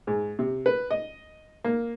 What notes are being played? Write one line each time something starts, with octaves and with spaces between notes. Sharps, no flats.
G#2
C3
B4
D#5
A#3